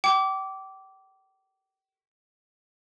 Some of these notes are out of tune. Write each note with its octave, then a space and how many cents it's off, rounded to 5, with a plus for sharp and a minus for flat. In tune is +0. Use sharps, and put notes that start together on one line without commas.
G5 -35 D6 -15